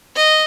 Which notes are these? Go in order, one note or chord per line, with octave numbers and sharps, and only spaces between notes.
D#5